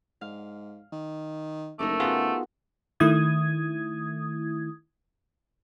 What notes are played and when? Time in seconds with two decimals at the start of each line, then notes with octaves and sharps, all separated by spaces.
0.21 G#2 F5
0.92 D#3
1.79 F#1 A3 D#4 A#4 D6
2.00 C#3 B3 F4 F#4 G#4 F#5
3.00 D#3 A3 E4 D#6 G#6